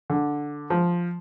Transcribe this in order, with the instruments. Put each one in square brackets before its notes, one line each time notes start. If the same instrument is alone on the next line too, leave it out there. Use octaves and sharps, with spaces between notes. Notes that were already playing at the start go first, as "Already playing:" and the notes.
[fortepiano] D3
F3